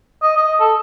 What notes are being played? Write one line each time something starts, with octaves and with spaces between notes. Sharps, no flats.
D#5
D#5
A4